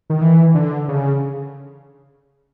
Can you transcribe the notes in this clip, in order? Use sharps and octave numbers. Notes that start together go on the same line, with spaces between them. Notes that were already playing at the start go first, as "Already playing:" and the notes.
D#3
E3
D3
C#3